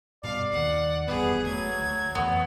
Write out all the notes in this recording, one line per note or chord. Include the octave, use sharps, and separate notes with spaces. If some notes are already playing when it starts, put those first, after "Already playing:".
G2 B2 D5 F5
D#2 D#3 F#5
F1 E2 G2 B3 G#4
F#3 A3 G#6
D2
F2 E3 B3